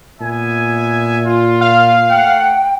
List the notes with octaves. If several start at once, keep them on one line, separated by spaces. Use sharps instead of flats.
A#2 B3 E5 G#5
F4
F5
A3 F#5 G5